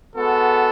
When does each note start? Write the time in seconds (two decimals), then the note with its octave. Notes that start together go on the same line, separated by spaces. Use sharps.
0.15 G#3 B3 F#4 A4